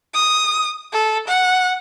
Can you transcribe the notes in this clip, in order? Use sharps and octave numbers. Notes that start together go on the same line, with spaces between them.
D#6
A4
F#5